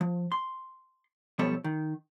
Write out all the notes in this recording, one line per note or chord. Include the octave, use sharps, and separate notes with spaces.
F3
C6
B1 F3 G3 B3 A4 C#5
D#3